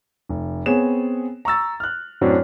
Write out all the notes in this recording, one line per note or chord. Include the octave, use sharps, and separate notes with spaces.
F1
B3 C4 G#4 C#5 E7
A#5 C#6 E6 A6
F6 F#6
F#2 A2 F#3 C4 D4